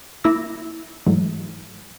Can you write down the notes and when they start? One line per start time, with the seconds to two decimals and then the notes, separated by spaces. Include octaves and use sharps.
0.24 A#3 E4 D6 E6 A#6
1.06 G#2 E3 F#3 G#3 A3